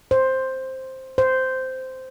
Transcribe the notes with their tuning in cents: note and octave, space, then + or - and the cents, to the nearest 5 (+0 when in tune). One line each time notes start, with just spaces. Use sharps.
C5 +5
C5 -10